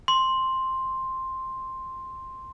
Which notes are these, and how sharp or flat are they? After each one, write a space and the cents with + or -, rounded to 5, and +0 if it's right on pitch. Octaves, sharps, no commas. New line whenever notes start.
C6 +5